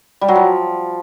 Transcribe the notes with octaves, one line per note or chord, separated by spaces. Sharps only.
G3
F#3
F3